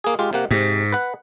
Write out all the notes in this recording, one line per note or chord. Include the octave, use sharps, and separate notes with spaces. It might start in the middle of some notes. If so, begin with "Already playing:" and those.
A#3 G#4
G#3 F4 G4
C3 A#3 F#5
G#2 C3
B4 F#5